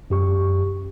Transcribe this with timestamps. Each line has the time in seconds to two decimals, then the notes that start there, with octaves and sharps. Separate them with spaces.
0.10 F#2 G4 C#6